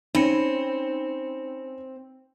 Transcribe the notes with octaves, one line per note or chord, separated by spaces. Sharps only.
C4 C#4 D#4 C#5 B5 C#7